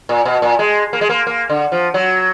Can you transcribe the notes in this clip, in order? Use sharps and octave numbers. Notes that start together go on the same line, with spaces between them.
A#2
B2
A#2
G#3
A#3
G#3
A#3
A#3
D3
F3
F#3